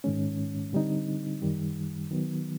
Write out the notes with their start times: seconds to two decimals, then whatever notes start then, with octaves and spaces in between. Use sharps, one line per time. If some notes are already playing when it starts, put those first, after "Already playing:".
0.04 G#2 D#3 G#3 C#4
0.73 D3 G3 C4 D#4
1.42 F#2 D#3 G3
2.11 D#3 F#3 B3